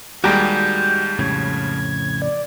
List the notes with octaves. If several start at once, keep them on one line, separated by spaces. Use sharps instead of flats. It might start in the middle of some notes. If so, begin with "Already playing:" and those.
D#2 G3 G#3 F#4 G4 A#5 G6
F2 A2 C#3 G#6
D5